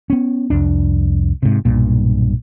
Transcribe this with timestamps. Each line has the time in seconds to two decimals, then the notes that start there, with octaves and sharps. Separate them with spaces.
0.10 B3 C#4
0.50 C2 F2 D4
1.43 G#2 C3
1.65 B1 G2 A#2